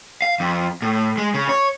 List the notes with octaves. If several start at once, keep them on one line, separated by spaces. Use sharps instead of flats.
F5
F2
A2
G#3
C#3
C#5